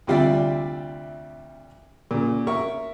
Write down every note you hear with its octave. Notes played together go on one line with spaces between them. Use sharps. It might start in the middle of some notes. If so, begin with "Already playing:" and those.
D2 C3 G3 F4 D5 E5
A#2 C#3
A#4 E5 C#6